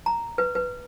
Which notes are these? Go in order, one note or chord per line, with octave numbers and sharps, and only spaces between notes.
A#5
B4
B4